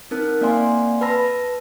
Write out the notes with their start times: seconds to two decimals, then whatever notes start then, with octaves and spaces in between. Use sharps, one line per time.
0.11 C4 D#4 A#4 F#6
0.41 A#3 C4 D5 F5 G#5 C6
1.01 B4 A5 B5 E6 A#6